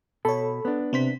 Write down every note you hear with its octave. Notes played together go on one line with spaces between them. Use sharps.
B2 A4 C#5 B5
B3 D4
C3 C4 C5 B6